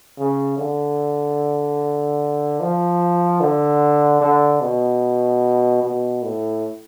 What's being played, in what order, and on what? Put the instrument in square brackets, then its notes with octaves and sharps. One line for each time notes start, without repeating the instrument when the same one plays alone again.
[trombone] C#3
D3
F3
D3
D3
B2
B2
A2